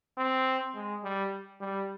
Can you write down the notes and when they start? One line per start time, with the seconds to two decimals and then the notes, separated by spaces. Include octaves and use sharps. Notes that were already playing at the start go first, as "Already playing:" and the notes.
0.18 C4
0.75 G#3
1.04 G3
1.61 G3